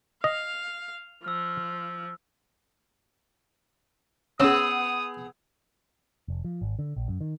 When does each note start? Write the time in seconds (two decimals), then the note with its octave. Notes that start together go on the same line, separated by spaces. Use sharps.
0.24 D#5 F5 F7
1.24 F3 E6 F6
4.40 B3 C#4 G#4 D#6 E6
6.28 F1
6.44 F3
6.62 G#1
6.79 D3
6.96 A#1
7.08 F#2
7.21 D#3